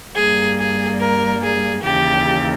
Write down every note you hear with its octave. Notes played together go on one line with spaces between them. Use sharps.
G2 G3 A#3 G#4
G#4
A#4
G#4
D#2 C#3 E3 G4